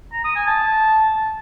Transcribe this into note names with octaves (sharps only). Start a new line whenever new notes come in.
A#5
D#6
G#5
A5